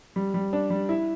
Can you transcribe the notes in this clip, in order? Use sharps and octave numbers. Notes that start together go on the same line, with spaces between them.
G3
G3
D4
G3
E4